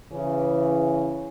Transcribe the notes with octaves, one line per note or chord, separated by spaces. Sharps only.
C#3 E3